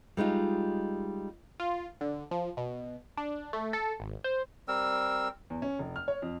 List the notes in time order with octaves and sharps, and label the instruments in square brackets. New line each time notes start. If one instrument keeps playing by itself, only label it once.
[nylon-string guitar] G3 G#3 D#4 F4
[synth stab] F4
D3
F3
B2
D4
A3
A4
G#1
C5
[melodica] G3 C4 A#4 E6
[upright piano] E2
C#4
F1
F6
C#5
F2